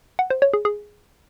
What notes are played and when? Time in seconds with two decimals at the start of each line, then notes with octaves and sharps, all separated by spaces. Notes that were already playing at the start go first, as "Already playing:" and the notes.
0.19 F#5
0.30 C5
0.42 C#5
0.53 G#4
0.65 G#4